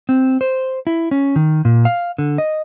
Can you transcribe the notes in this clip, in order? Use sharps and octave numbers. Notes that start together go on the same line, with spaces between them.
C4
C5
E4
C#4
D#3
A#2
F5
D3
D#5